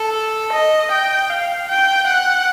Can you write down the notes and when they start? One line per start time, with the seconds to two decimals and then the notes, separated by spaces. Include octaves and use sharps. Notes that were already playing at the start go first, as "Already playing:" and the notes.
Already playing: A4
0.53 D#5
0.91 G5
1.29 F5
1.69 G5
2.07 F#5